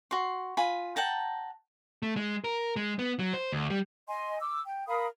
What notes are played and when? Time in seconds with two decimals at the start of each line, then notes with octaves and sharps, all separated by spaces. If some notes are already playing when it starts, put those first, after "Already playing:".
0.11 F#4 C6
0.57 F4 G#5 B5
0.96 F#5 G5 A5 A#5
2.03 A3
2.16 G#3
2.44 A#4
2.76 G#3
2.99 B3
3.19 F#3
3.34 C5
3.52 D2
3.70 G3
4.08 D#5 G#5 C6
4.41 D6 E6
4.64 G5
4.88 A#4 F5 B5 D#6